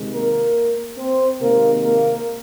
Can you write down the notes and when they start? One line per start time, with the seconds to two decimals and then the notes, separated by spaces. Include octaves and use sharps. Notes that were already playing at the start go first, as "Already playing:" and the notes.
Already playing: C3 D#3 G#3
0.14 A#3 A#4
0.98 C4 C5
1.41 C3 D#3 G#3 A#3 A#4
1.83 A#3 A#4